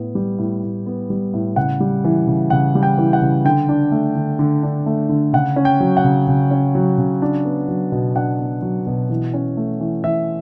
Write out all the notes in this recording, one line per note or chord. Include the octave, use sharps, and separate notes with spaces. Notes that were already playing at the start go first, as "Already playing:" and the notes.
Already playing: A2 B3
G3
A2
A2
B3
G3
A2
C#3 F#5
G3
E3
C#3
C#3 F#5
G3
G5
E3
F#5
C#3
D3 G5
D4
A3
D3
D3
D4
A3
D3
C#3 F#5
C#4
G5
F#3
F#5
C#3
C#3
C#4
F#3
C#3
D4
B3
F#3
B2
D4 F#5
B3
F#3
B2
E3
C#4
A3
E3
E3 E5